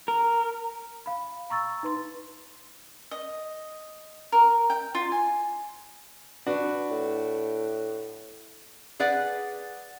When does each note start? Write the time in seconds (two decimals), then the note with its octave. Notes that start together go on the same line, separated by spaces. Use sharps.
0.08 A#4
1.06 F5 B5
1.50 A#5 C#6 E6 A6
1.83 D#4 B4 C6
3.11 D#5
4.32 A#4
4.70 G5
4.95 F4
5.12 G#5
6.46 D4 F#4 B4
6.91 A2
9.00 G#4 B4 D5 F#5